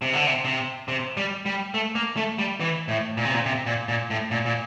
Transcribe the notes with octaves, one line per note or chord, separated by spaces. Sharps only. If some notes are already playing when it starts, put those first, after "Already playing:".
C3
D3
C3
C3
C3
G3
G3
A3
A#3
A3
G3
E3
A2
A#2
C3
A#2
C3
A#2
A#2
A2
A#2
A#2